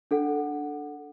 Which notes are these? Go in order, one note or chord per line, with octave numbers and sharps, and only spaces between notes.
D4 A4 F#5